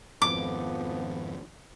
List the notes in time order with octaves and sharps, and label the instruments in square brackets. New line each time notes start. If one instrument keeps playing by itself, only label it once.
[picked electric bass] G#1 F2 [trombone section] A2 F3 B3 [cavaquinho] D6